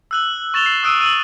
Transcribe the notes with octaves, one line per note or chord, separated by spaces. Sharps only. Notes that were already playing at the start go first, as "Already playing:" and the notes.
E6 F#6 F#7
C#6 A6 E7 F7 G7
C7
D#6 E6 F#6 D7 D#7
E6 D#7 F#7